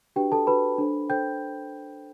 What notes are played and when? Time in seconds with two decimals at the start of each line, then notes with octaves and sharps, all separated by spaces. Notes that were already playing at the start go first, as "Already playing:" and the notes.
0.16 D4 F#4 G4 B4 G5
0.32 A4 A5
0.47 D4 F#4 B4 B5
0.78 D4 A4 C5
1.09 D4 A4 C5 G5 G6